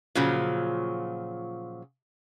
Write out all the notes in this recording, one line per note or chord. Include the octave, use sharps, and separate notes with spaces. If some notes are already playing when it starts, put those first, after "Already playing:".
A#2 C#3 F3 F#3